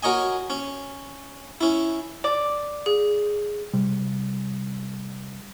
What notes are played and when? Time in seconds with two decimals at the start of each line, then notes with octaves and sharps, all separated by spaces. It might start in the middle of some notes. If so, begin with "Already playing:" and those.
0.03 F#4 A#4 C#5 D#5 G#5
0.50 C#4
1.61 C#4 E4
2.24 D5
2.86 G#4
3.73 C3 G3